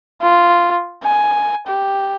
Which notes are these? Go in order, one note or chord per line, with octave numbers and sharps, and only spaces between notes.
F4
G#5
G4